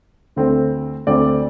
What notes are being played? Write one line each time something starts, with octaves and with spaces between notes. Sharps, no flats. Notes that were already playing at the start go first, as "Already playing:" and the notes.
D2 D3 A3 C4
D2 D3 A3 C4 D5